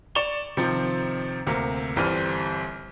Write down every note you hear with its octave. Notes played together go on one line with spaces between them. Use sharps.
D5 C#6 E7 F7 G7
C3 D#3 F3 C4
D2 C3 A#3
G1 E3 G3 C4 F6 D#7